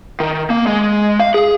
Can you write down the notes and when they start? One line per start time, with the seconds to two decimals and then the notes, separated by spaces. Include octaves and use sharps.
0.20 D#3
0.50 A#3
0.67 G#3
1.19 F5
1.34 G#4